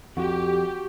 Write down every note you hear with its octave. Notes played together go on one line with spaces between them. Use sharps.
F2 F#4 G4